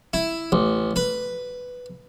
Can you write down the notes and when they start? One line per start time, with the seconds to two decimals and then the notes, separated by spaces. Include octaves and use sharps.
0.13 E4
0.52 A1
0.96 B4